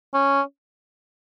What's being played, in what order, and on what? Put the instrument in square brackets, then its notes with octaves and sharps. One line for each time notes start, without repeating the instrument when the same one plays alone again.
[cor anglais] C#4